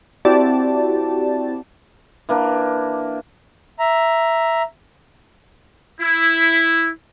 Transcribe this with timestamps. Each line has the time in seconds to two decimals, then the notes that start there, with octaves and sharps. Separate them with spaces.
0.25 C4 E4 F#4 G4 D5 A5
2.29 E3 A#3 D4
3.79 E5 A#5
6.01 E4